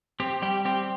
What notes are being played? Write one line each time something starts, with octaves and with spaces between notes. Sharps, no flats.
C4 G4
G3 G4
C4 G4